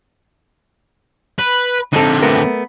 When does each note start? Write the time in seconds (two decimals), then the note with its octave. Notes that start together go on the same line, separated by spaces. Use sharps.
1.39 B4
1.93 D3 C4 D#4 A4
2.23 A3 B3 A#4